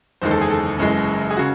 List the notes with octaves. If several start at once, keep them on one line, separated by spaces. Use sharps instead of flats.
F#1 E2 D#3 G#3 C5
A4
G#4
A4
F#1 F#2 E3 G#3
G#4
C#3 F#4